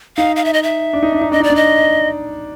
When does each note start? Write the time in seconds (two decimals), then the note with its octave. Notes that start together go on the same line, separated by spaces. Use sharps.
0.17 D#4 F5
0.36 F5
0.45 E5
0.53 D#5
0.63 E5
0.93 D4
1.03 D#4
1.13 D4
1.21 D#4
1.32 D4 D#5
1.40 D#4 D5
1.50 D4
1.56 D#5